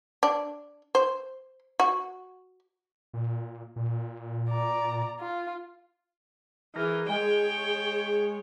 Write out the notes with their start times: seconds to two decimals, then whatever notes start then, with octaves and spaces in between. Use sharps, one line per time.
0.23 D4
0.95 C5
1.80 F#4
3.13 A#2
3.76 A#2
4.50 D5 A#5
5.20 F4
6.75 E3 G#4 A#4
7.08 G#3 G#4 C#5 G5